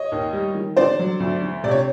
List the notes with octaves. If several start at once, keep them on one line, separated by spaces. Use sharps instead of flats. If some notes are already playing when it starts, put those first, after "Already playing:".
Already playing: C#5 D#5
D#2
G3
D#3
D3 C5 D5
F#3
D2
D3
C3 D5
C#5